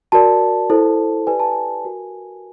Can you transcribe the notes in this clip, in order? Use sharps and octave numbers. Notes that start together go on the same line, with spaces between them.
F#4 A#4 D5 A5
E4 A4 C5
G4 B4 D5 G#5
A5
G#5
F#4 A#4